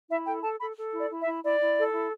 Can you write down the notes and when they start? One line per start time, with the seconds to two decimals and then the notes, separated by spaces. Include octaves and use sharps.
0.09 E4 E5
0.25 A4 G5
0.42 A4 A5
0.59 A4 B5
0.76 A4
0.92 E4
0.99 D5
1.10 E4
1.21 E5
1.27 E4
1.43 E4 D5
1.60 E4
1.77 A4
1.94 E4